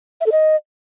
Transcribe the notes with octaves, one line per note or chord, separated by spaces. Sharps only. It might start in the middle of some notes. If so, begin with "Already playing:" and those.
E5
A4
D#5